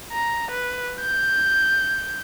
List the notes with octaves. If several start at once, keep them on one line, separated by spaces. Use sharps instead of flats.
A#5
B4
G6